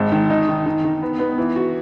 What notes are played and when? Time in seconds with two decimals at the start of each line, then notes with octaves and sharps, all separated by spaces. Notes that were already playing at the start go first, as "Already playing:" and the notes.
Already playing: G#1
0.12 D#3
0.30 D#4
0.49 D#3
0.66 D#3
0.84 D#3
1.02 B3
1.19 B3
1.38 E3
1.56 F#4